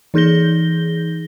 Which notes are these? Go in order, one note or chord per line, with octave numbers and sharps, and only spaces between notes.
E3 D#4 G#4 G6 A#6 G7